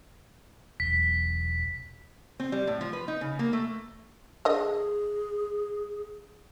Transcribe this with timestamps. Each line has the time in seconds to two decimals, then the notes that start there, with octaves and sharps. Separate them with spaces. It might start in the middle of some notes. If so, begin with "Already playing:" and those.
0.80 E1 B1 B6
2.40 C4
2.52 G3
2.67 A2
2.81 F3
2.93 B4
3.08 D#4
3.21 C#3
3.39 A#3
3.53 A3
4.45 D3 G#4 D#5